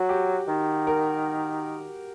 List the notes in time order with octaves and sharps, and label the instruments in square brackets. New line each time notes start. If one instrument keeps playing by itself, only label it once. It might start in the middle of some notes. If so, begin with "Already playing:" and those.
Already playing: [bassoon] F#3 [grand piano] F#4
[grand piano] G4
[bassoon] D#3
[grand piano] A#4